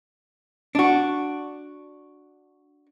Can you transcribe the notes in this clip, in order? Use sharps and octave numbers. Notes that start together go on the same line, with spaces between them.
D4 F#4